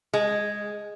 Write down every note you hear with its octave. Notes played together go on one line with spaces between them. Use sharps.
G#3